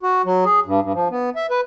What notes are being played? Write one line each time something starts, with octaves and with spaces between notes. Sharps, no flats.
F#4
F#3
G#4
G2
G2
F3
B3
E5
B4